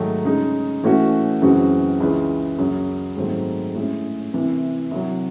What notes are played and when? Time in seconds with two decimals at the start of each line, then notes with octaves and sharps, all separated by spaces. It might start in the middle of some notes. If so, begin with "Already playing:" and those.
Already playing: G#2 D#3 F#3 A3
0.25 C#3 G#3 D#4
0.83 A2 E3 A3 C#4 F#4
1.42 F#2 C#3 E3 C4 F#4
2.00 C#2 C#3 E3
2.59 F#2 C#3 F#3
3.17 G#2 D#3 F#3 A3 C4
3.75 A2 G#3 C#4
4.33 C2 C3 E3
4.91 C2 C3 F#3